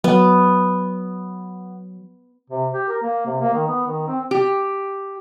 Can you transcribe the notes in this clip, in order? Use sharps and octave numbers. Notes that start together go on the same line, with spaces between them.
F#3 B3
C3
G4
A#4
A#3
C3
A#3
D#3
B3
D#3
C4
G4